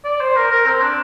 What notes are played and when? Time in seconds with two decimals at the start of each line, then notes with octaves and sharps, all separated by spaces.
0.05 D5
0.20 C5
0.36 A#4
0.51 A#4
0.67 C4
0.82 D4